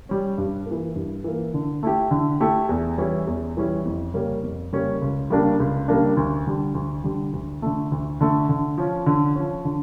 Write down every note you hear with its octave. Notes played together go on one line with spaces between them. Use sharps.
G3 C#4
G2
E3 A#3
G2
E3 A#3
D3
A3 E4 G4
D3
A3 E4 G4
E2
E3 G3 C#4 E4
E2
E3 G3 C#4 E4
F2
C#3 G3 A#3 C#4
F2
C#3 G3 A#3 C#4
C#2
C#3 G3 A#3 D4
C#2
C#3 G3 A#3 D4
D2
D3 G3
D2
D3 G3
D2
D3 A3
D2
D3 A3
D3
F3 C#4
D3
F3 C#4
D3